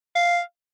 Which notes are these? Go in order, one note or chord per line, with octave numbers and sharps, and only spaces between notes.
F5